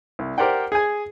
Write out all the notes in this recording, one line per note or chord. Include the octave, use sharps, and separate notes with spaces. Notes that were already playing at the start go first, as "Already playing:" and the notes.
C2
G4 A#4 C5 D5 F#5 G5
G#4 G#5